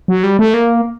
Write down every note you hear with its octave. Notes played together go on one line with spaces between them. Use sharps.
F#3
G3
A3
A#3